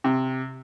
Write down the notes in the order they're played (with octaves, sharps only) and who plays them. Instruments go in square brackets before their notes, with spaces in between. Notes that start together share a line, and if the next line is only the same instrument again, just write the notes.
[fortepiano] C3